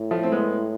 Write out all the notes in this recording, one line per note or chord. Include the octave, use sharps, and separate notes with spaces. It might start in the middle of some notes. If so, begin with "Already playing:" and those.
Already playing: A2
F3 A3
C4
G#3 B3